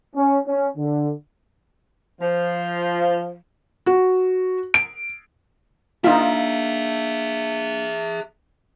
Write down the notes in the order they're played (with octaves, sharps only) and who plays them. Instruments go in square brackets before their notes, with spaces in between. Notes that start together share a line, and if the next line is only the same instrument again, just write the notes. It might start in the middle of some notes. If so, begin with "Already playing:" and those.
[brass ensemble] C#4
C#4
D3
[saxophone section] F3
[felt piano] F#4
D7
[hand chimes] A#3 D4 F5 [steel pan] D#4 F4 [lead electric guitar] G#4 E5